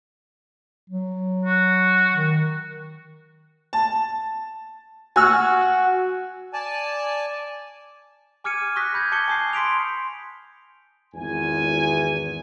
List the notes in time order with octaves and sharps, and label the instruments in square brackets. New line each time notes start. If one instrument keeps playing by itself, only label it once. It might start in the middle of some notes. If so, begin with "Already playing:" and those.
[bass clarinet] F#3
[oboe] F#4
[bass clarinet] D#3
[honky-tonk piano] A5
[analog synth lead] F#4 [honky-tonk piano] G#5 E6 F6
[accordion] D5 G#5 A5
[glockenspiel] G#5 D6 F6 G#6 C#7 D#7
C#6 D#6 F#6 A#6 B6
B5 G6 G#6 A#6
A5 D6 G6 G#6 C#7 G7
G#5 A5 D#6 G6 C7
C6 B6 D7 F7
[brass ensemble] G#1 E2 G#5